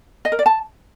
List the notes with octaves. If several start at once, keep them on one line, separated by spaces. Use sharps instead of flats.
D#5
A#4
D5
A5